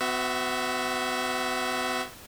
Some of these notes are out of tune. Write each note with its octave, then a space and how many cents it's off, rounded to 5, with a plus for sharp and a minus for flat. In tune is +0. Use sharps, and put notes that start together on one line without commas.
B3 +40 F#4 +0 E5 +0